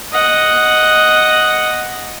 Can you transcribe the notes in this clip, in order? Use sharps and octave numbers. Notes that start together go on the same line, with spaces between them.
D#5 F#5